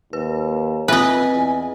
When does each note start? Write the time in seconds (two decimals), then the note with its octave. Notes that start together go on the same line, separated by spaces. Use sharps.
0.13 D#2 B4
0.88 C4 F4 B4 D#5 E5 G#5
1.32 E2